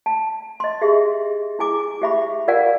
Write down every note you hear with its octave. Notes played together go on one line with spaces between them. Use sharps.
A5
D#5 C6
G4 G#4 E5
E4 G#4 G#5 D6
G4 E5 B5 C#6
F4 A#4 D5 F5 F#5 G#5